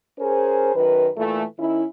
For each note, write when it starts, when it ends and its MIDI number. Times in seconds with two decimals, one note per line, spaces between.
0.19 0.71 61
0.19 0.71 68
0.19 0.71 70
0.19 0.71 72
0.75 1.09 42
0.75 1.09 51
0.75 1.09 71
1.16 1.44 46
1.16 1.44 52
1.16 1.44 57
1.59 1.84 51
1.59 1.84 61
1.59 1.84 64